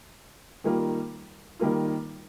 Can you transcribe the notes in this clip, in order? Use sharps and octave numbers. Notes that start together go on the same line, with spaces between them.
D#3 G3 A#3 F4
D#3 G3 A#3 F4